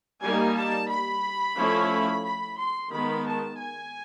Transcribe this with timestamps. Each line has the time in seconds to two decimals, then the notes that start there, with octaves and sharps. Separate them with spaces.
0.22 G3 A#3 D#4 G#5
0.55 A5
0.89 B5
1.57 F3 A3 C#4 E4
2.24 B5
2.58 C6
2.91 D#3 G#3 B3 B5
3.26 A5
3.59 G#5